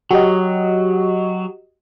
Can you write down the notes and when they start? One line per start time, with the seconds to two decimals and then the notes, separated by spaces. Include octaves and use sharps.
0.11 F#3 F#4 G4 D#5